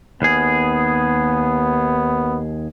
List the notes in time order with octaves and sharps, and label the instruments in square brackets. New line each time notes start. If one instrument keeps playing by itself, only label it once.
[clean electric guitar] D#2 G#4 [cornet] B3